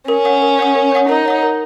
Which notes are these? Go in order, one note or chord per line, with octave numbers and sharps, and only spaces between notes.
C#4 A#4
C#5 F#5 D#6
A#4
C#5 F#5 D#6
A#4
C#5 F#5 D#6
D#4 A#4
C#5 F#5 D#6
A#4